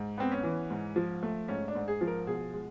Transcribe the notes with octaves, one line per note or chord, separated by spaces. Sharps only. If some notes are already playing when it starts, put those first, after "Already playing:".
Already playing: G#2
B3 C4
C#4
E3
G#2
F3
A3
G#2 C#4
D4
G#2
G#4
F3
A#4
B2 G#4
G#3